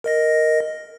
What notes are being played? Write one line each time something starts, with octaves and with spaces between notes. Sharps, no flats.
A#4 D#5 A#6